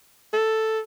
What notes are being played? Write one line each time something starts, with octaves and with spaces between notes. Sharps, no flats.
A4